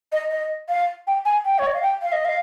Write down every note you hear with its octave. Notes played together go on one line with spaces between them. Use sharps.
D#5
D#5
F5
G5
G#5
G5
C#5
D#5
F5
G5
F5
D#5
F5